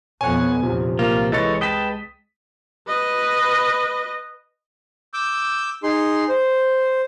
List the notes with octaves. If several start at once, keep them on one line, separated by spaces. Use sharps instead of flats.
F2 B2 B3 C#5 F#5 G#5
A#1 E2 C3 F3 F#3
C2 A#3 F4
E3 G#3 A4 C#5 D#5 A6
B4 G5 A5 D#6 B6
B4 D#5
D6 E6 G6
D#4 G#4 C6
C5